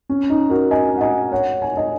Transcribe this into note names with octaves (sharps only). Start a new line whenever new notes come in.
C#4
D#4
F#4 A#4
D#5 G#5
F#5
D#5 G#5
C#5 F#5
G#5
D#5 G#5